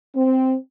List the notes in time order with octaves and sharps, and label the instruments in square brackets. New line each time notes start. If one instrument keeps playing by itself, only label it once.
[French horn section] C4